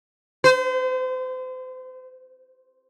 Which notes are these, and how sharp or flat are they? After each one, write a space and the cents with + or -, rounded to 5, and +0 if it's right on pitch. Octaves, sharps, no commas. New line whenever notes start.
C5 -35